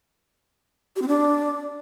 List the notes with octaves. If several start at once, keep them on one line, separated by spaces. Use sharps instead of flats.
G4
C4
D4